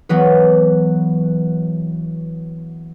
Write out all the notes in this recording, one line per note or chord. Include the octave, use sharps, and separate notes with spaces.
E3 F#3 B3 B4